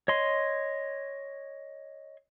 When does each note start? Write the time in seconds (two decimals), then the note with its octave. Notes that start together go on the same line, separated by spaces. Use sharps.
0.08 C#5 D#5 C6